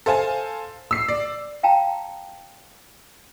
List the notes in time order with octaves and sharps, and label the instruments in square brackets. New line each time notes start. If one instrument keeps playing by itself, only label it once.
[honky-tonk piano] A4 C5 F5 G#5 A5
E6 C7
D5
[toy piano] F5 G5 A5 A#5